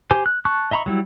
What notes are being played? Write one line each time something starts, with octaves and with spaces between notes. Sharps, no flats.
G4 C5 G#5
F#6
A5 C#6 F#6
D#5 E5 A#5 B5 C#6
F#3 G3 E4